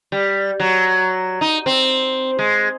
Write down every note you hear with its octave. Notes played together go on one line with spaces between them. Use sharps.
G3
F#3
D#4
C4
G#3